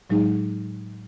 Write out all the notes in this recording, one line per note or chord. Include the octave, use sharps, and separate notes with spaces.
A2 F#3 G#3 D#4 G#4